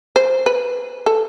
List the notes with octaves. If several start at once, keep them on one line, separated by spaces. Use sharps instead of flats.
C5
B4
A4